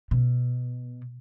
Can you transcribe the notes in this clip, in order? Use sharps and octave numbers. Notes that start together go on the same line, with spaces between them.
B2